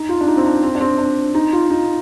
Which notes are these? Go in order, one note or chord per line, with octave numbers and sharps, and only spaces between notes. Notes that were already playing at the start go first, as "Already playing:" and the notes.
Already playing: D#4
F4
D4
D#4
C4
D4
C4
D4
C4
D4
D#4
F4
D#4